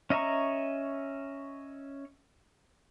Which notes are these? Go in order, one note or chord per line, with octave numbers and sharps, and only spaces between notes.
C#4 D#5 E5 A#5 C#6